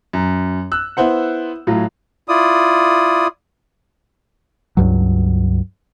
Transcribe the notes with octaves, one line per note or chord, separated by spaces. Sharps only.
F#2
E6 F#6
B3 E4 C5 F#5
A2 F#3 F4
E4 F4 D5 D#6
C#2 G2 F#3